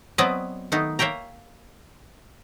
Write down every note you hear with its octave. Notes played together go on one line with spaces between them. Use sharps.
F#3 B3 C4 B4 D5 D#5
D#3 A3 B3 D#4
A#3 C#5 E5 G5 A#5